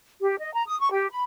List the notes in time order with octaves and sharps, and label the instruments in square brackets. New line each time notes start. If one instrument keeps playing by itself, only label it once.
[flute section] G4
D#5
A#5
D#6
C#6
G4
B5